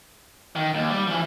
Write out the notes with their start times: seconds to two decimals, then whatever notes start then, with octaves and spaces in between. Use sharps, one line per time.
0.56 D#3
0.74 D#2
0.91 G3
1.07 E3 F3